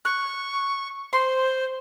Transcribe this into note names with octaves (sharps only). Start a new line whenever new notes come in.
C#6 F#6
C5 C6